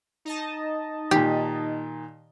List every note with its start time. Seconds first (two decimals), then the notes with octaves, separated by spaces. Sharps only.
0.25 D#4 D#5 A5
1.11 A#2 D#3 G4